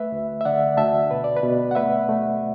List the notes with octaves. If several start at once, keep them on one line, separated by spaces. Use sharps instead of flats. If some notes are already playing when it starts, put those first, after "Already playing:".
Already playing: A3 B4 E5
D2
E5
D3 D5 F#5
D2 E5 A5
B2 B4
D5
B4
B2
F#5
A3 B4 E5
A3